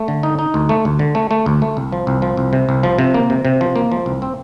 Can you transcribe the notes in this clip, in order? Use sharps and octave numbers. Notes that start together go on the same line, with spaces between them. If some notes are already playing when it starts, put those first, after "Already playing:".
Already playing: A3
D3
D#4
D#4
D2
A3
D2
D3
A3
A3
D2
A3
C2
F3
C2
F3
C2
C3
C2
F3
C3
A#3
C3
C3
F3
A#3
F3
C2
C4